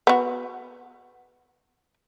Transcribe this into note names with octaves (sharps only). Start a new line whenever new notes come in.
B3 F#4